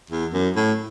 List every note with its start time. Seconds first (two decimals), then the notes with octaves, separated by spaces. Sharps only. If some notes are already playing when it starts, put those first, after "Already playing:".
0.10 E2
0.33 F#2
0.56 A2